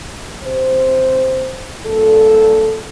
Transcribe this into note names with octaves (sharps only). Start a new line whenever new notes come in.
C3 C5
G2 A#2 A4